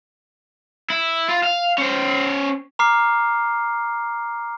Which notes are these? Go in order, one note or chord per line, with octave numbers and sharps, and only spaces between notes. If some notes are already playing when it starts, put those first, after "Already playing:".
E4
F4
F5
C#4 C5
A#5 D6 F6 C7